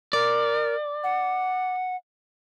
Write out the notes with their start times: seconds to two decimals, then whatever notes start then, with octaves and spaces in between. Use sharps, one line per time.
0.13 A#4 D5
1.04 F#5